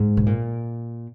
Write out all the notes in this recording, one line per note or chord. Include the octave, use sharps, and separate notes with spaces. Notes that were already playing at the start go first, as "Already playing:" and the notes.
Already playing: G#2
B2
A#2